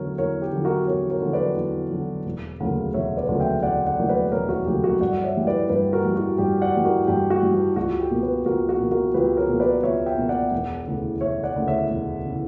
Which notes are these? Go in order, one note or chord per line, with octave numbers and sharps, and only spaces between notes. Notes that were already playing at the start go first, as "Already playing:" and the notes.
Already playing: E2 D3 F#3 A#4 C#5
E2 A#4 C#5
G4
D3 F#3
F#4 A#4
E2 A#4 C#5
A#4 C#5
D3 F#3
B4 D5
E2
D3 F#3
E1
D2 C#3 F#3 A#3
E1 C#5 E5
B4 D5
D2 C#3 F#3 A#3
E5 G5
E1 D5 F#5
D5 F#5
D2 C#3 F#3 A#3
B4 D5
E1 A#4 C#5
F#4
D2 C#3 F#3 A#3 G4
F#4 A#4
G2 D5 F#5
D5
C#5 E5
E3 G3
B4 D5
G2 G4 B4
F#4 A#4
E3 G3
F#4
G2 G4
D5 F#5
E3 G3
F#4 A#4
G2 G4
F#4
E3 G3
G4
C#2 F#4
G4
B2 A#3
G4 B4
C#2 F#4 A#4
F#4
B2 A#3
F#4 A#4
C#2 G4 B4
A#4 C#5
B2 A#3
B4 D5
C#2 C#5 E5
E5 G5
B2 A#3
D5 F#5
E1
D2 C#3 E3
E1 C#5 E5
D5 F#5
D2 C#3 E3
C#5 E5
E1
C#3 E3